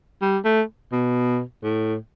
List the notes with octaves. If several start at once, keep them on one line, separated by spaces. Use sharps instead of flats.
G3
A3
B2
A2